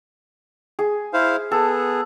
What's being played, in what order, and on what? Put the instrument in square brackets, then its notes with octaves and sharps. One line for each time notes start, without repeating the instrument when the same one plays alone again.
[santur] G#4
[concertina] E4 C5 F5
[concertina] B3 G#4 [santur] A4